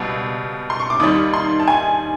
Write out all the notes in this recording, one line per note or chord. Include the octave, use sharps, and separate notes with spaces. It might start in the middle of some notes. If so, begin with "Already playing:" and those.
Already playing: C#2 B2 G3 E6
C6
C#6
D6
D#2 D#3 G3 D#6
C6
A5
G#5